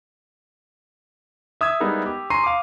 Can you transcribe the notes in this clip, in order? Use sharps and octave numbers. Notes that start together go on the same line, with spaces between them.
E5 D#6 E6 G#6
G3 G#3 B3 D#4 E4 A#4
G4
G#5 A#5 C6 C#6 C7 D#7
F5 D6